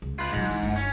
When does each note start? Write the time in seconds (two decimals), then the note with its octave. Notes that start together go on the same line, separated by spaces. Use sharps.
0.02 C#2
0.19 F4 B4
0.32 A#1 G#2 F#3
0.49 E3
0.63 G1 D4
0.76 C#4